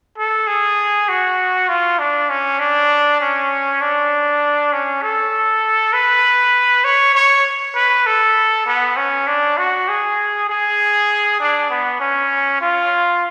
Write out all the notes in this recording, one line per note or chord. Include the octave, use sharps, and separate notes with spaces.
A4
G#4
F#4
F4
D4
C#4
D4
C#4
D4
C#4
A4
B4
C#5
C#5
B4
A4
B3
C#4
D4
F#4
G#4
G#4
D4
B3
C#4
F4